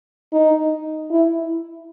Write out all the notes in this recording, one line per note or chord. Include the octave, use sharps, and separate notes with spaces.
D#4
E4